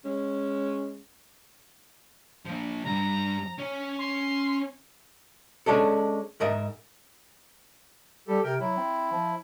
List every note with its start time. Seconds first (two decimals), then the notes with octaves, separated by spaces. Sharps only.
0.04 G#3 C#4
2.46 F3 A#3
2.84 C2 G2 A#5
3.59 C#4 C#5
3.99 C6
5.66 G#3 C#4 D4 A4
6.40 G#2 A#4 D#5 E5
8.28 G3 G4 A4
8.44 C3 A#4 G5
8.60 F#3 E4
8.77 C4
9.11 F3